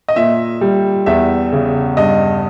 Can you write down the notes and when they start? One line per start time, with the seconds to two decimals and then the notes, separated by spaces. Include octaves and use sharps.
0.08 D#5
0.16 A#2 E5
0.61 G3
1.06 E2 E5
1.52 C#3
1.97 G2 D#5